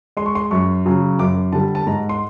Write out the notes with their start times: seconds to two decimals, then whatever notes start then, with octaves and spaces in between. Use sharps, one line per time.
0.17 G#3 C6
0.26 C#6
0.35 C6
0.51 F#2 C#6
0.86 C#3 F#3
1.19 F#2 D6
1.52 D3 G3 A5
1.75 A5
1.87 G#2 A#5
2.09 C6